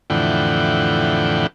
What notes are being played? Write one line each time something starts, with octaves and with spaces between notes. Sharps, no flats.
F2 A2 D3 E3 F#5 G5